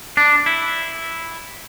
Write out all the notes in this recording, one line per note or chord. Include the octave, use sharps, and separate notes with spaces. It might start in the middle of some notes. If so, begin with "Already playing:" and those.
D4
E4